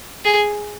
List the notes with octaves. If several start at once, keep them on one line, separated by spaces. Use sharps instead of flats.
G#4